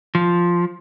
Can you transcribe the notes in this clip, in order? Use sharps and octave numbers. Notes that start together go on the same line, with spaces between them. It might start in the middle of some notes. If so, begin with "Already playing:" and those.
F3